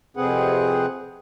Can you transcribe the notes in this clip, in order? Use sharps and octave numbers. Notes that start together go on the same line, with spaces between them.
F2 C3 C4 G#4 B4 F#5